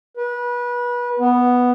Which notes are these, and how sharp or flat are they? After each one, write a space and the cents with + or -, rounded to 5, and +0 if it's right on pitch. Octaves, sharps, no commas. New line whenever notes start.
B4 -25
B3 +0